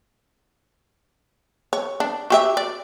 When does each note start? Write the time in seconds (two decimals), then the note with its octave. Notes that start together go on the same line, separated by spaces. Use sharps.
1.73 C#5
2.00 D4
2.30 F#4 G4 E5
2.57 D5